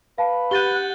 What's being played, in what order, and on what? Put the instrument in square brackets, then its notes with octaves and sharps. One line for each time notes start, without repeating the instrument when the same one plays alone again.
[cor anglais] B4 [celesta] F5 A5
[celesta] G4 D#7 [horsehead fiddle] F#5 [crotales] G6 A6 G7